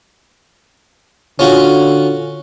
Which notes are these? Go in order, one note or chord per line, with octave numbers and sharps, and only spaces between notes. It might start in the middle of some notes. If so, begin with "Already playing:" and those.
D3 C#4 F4 F#4